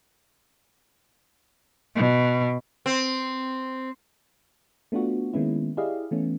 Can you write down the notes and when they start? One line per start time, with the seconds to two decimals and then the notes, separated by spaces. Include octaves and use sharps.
1.95 B2
2.86 C4
4.92 A3 B3 D4 F4 F#4
5.33 D#3 G#3 A#3 B3 C#4 E4
5.77 E4 G4 G#4 D5 D#5 F5
6.11 E3 A3 B3 C#4